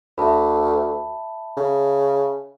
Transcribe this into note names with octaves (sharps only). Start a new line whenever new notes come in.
D2 E5 A5 B5
C#3